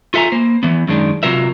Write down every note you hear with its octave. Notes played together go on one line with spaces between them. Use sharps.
F4 A4 E5 G#5 A#5
A#3 C5
E3 B3
F#2 D#3 G#3 D4
C3 F#3 F4 A#4 E5